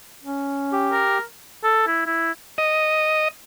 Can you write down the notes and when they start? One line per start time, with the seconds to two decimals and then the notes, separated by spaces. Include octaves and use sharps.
0.23 C#4
0.72 G4
0.92 A#4
1.64 A4
1.87 E4
2.07 E4
2.58 D#5